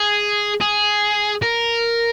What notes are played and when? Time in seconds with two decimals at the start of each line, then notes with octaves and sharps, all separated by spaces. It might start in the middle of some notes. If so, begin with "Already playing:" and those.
Already playing: G#4
0.61 G#4
1.42 A#4